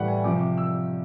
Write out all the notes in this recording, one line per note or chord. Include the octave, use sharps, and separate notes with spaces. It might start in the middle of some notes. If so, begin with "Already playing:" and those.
Already playing: A2 E3 G3 F#5
G#5
C3 F3 D6
D6
E6